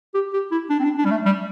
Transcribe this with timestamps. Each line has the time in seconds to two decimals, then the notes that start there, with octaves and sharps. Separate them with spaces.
0.14 G4
0.33 G4
0.52 E4
0.70 D4
0.80 C4
0.84 D4
0.98 D4
1.05 G3
1.11 A3
1.25 G3